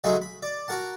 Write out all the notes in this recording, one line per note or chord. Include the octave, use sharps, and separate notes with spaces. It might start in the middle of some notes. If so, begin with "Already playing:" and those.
C#3 F#3 G#3 A3 D#4 G#4
B5
D5
F#4 A#4 F#5 A5